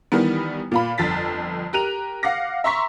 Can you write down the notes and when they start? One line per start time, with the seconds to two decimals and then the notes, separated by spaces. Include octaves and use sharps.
0.12 D#3 E3 G3 B3
0.72 A#2 F4 B5
0.98 G1 F2 A6 B6
1.73 G4 A#4 F#6 D#7 F7
2.23 F5 F#5 D6 A#6
2.64 E5 A#5 C6 C#6 B6